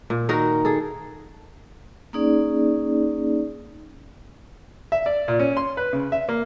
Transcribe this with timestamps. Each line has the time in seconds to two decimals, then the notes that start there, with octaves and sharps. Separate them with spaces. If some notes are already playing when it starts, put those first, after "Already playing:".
0.10 A#2
0.29 D#3 D#4 F#4 A#4
0.65 G#4 A4
2.13 A#3 C#4 D#4 G#4 D5
4.92 E5
5.06 D5
5.28 A#2
5.40 C#4
5.57 C6
5.77 B4
5.93 C#3
6.12 E5
6.29 A#3